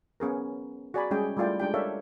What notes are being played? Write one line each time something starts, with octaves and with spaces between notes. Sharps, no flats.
B3 C#4 G#4 A#4
F#4 G#4 D5 G#5 A#5 B5
G3 G#3 C#4 G#4 G5
G3 A3 E4 F4 D5 G5
G#3 D4 G4 G5
A4 A#4 C#5 D5 E5 F5